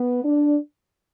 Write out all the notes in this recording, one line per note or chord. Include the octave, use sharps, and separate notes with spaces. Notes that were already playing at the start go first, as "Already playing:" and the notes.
Already playing: B3
D4